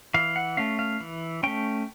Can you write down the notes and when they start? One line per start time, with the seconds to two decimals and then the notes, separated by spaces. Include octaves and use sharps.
0.14 E3 F5
0.36 F#5
0.57 A3 C#4 F5
0.79 F5
1.00 E3
1.43 A3 C#4 G5